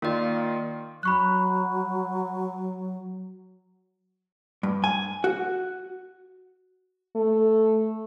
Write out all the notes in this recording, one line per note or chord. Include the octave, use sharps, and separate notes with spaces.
D#3 A#3 F4 D5
F#3 B5 C#6 F#6
G2
G#5
F#4
A3